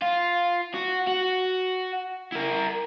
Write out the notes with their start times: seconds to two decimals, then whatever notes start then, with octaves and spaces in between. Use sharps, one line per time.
0.02 F4
0.74 F#4
1.07 F#4
2.32 E4 A#4